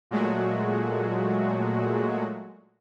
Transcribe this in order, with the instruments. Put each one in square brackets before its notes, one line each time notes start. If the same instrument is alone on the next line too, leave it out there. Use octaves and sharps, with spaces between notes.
[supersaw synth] A#2 F#3 G#3 A3 F#4